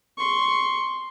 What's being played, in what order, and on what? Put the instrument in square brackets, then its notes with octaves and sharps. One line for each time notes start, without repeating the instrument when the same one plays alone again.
[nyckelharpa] C6 C#6